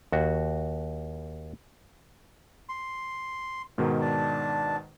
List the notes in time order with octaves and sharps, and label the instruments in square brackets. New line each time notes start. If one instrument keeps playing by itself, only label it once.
[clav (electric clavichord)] D#2 F#4
[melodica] C6
[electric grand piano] G#2 B2 D#3 [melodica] A#4
[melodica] D4 A5